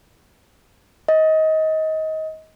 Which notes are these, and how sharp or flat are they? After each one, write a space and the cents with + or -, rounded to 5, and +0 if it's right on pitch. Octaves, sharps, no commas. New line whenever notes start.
D#5 +25